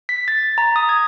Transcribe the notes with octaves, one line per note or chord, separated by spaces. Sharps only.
B6
A6
A#5
D#6
G#6